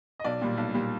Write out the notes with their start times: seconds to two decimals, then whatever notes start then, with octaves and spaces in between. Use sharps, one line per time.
0.20 D#5
0.24 B1 D5
0.41 A#2 G3
0.58 B1
0.74 A#2 G3